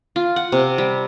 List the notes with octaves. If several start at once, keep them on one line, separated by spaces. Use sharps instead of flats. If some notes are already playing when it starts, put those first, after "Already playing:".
F4
F#5
C3
G3